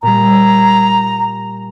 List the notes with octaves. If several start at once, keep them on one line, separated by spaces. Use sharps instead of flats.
A#2 G3 A#5